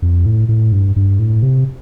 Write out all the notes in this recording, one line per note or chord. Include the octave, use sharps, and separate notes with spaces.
F2
A2
A2
G2
G2
A2
C3